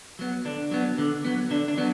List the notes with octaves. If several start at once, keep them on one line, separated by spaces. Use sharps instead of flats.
F#3 B3
D3 D4
F#3 B3
D3
F#3 B3
D3 D4
D4
F#3 B3